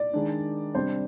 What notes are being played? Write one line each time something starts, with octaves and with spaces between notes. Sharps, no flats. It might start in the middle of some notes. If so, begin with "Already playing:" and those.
Already playing: D5
D#3 G#3 D4
C3 G3 D4 C5